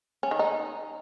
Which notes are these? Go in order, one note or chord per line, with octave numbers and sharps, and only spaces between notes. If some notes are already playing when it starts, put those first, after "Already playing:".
C#4
D#3
D#4